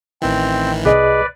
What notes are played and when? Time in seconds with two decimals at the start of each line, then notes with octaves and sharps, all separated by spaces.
0.22 A1 D#3 E3 C4
0.85 C2 G#4 B4 D5 D#5